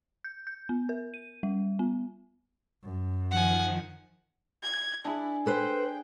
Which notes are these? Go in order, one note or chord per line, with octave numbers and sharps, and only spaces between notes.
G6
G6
B3
A#4
D#7
G3
B3
F#2
D#3 F3 F#5 G#5
G#6
D4 E4 G#4
A4 B4 C5 G5